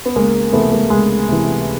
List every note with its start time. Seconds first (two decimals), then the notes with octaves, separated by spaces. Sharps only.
0.06 B3
0.16 C#2 G#3 A#3
0.53 C3 E3 A3 B3
0.72 G#3 A#3
0.90 C#2 G#3
1.28 C3 E3